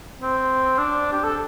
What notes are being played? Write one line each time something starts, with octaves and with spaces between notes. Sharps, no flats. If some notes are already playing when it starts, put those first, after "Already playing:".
C4
D4
G4
A4